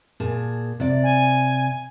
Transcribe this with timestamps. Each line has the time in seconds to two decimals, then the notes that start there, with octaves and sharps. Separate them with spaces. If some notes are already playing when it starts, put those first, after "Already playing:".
0.20 A#2 G#4 A5
0.80 C3 D5
1.03 G#5